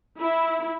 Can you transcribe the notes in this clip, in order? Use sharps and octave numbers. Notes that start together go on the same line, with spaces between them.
E4